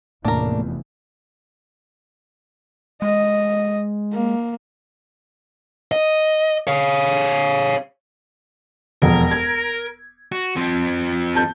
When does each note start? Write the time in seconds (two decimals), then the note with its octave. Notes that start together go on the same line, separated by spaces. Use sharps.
0.25 F1 E2 A2 A3 A#3 D4 A#4
3.02 G#3 D#5
4.13 A#3
5.92 D#5
6.67 C#5 F5
9.02 E1 F2 A#4
9.31 G#6
10.32 F#4
10.56 F3 C4
11.35 A5 G6